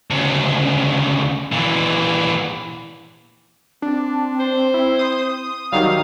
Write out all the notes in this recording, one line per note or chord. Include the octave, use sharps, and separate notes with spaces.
D2 C#3
A#2 E3
C4 D4
C5
E4
D#6
D#3 F#3 G3 D#4 F5